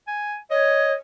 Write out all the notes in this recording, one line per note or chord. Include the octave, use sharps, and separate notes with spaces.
G#5
C#5 D#5